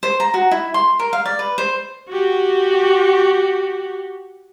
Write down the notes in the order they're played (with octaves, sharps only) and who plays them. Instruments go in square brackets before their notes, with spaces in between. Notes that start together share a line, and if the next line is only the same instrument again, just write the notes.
[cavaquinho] C5
A#5
F#4
E4
C6
A#4
F5
D5
B4
C5
[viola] F#4 G4